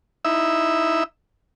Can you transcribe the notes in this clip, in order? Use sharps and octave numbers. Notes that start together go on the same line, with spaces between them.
D#4 E4 E5